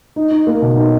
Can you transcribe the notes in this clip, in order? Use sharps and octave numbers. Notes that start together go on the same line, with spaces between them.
D#4
D#4
A#3
B2
D#4